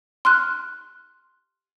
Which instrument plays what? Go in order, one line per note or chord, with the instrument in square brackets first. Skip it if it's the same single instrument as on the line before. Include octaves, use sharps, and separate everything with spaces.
[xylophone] C6 F6 F#6